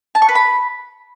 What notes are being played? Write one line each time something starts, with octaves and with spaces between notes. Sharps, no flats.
A5
C#6
B4
B5